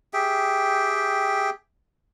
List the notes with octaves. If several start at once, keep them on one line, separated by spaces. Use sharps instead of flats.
G4 G#4 E5 G5